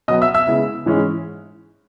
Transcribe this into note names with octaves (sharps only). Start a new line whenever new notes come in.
B2 F#3 B3 D#5 D#6
E5 E6
E5 E6
C#3 G#3 B3 E4
G#2 E3 G#3 C#4 E4